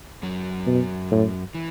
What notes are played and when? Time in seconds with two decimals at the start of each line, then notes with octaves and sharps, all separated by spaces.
0.23 F#2 F#3
0.67 B2
1.11 A2
1.55 E3